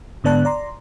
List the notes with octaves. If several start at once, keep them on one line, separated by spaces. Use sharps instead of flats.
G#2 D3 B3 D5 A5 F#6
D5 A#5 C6